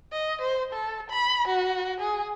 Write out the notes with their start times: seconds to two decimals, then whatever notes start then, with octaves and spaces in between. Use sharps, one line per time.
0.12 D#5
0.41 C5
0.73 A4
1.10 B5
1.47 F#4
2.00 G#4